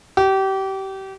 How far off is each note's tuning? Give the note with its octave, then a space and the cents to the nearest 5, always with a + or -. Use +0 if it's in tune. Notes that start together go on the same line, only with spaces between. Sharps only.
G4 -30